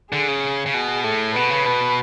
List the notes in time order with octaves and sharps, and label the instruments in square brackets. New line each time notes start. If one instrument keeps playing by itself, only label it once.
[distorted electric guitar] D3 [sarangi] G#4
[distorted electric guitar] C#3
C#3
B2
[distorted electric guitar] A2 [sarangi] A4
[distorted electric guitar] B2 [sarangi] B4
[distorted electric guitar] C#3
B2